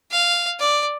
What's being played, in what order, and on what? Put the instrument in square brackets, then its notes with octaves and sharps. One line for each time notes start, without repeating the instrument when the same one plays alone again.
[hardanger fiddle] F5
D5